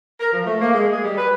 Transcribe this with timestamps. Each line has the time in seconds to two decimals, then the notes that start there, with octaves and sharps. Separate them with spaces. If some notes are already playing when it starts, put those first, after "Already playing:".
0.20 A#4
0.33 F3
0.46 A3
0.61 A#3
0.74 G#3
0.92 G#4
1.04 G3
1.18 B4